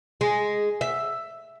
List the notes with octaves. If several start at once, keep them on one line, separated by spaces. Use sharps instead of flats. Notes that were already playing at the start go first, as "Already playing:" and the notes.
G#3
E5